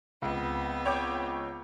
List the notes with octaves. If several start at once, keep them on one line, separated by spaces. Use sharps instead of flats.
C#2 B3 C4
C#5 G5 D6